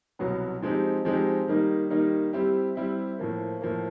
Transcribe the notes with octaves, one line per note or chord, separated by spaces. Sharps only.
C2 B2 F#3 B3
F3 G#3 C4 D#4 G4
F3 G#3 C4 D#4 G4
D#3 G3 A#3 D#4
D#3 G3 A#3 D#4
G3 C4 E4 G4
G3 C4 E4 G4
A2 F3 A#3
A2 F3 A#3